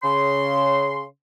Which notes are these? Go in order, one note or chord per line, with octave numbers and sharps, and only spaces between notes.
C#3 C6